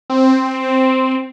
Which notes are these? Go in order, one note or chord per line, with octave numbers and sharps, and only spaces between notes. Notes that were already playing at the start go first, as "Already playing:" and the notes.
C4